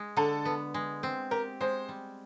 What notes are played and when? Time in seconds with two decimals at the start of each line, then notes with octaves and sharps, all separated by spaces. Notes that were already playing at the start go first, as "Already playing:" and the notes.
Already playing: G#3
0.17 D3 A4
0.45 B3
0.74 G#3
1.03 C4
1.31 G4 A#4
1.60 G#3 C5
1.89 G3